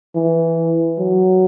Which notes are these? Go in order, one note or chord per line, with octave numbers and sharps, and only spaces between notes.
E3
F#3